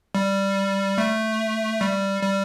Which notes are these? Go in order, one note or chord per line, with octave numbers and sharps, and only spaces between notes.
G3
A3
G3
G3